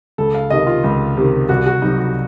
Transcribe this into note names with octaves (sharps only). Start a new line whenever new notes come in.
C#2 A4
F5
C3 D#3 D#5
F4
C#2
C3 D#3
C2 F#4
F#4
C3 F#3 D#4
F#4